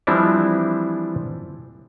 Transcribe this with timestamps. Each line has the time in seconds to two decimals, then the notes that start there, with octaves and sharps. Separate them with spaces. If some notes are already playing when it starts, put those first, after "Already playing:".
0.07 E3 F3 G3 C4 D4 E4